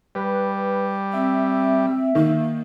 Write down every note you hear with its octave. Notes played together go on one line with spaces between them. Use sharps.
G3 B4
C4 E5
D#3 A#3